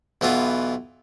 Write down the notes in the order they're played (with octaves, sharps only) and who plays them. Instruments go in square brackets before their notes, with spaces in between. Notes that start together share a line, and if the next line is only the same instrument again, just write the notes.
[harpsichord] B1 E3 B3 F4